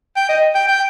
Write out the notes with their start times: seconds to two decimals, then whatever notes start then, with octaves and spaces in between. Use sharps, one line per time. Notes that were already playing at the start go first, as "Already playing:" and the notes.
0.16 G5
0.29 D#5
0.55 G5
0.67 G5